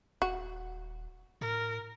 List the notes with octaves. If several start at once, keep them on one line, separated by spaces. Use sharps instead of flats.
D#1 F#4
A2 A#4